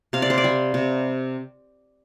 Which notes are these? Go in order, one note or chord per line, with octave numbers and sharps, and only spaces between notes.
C3 F5
D5
C5
D5
G3
C3